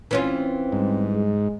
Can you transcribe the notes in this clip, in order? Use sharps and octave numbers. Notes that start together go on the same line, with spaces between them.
E3 C4 C#4 F4
G#2 G3
G#3